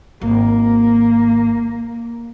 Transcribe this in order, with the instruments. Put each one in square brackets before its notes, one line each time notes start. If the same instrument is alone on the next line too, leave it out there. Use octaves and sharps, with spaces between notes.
[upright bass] G#1 [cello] A#3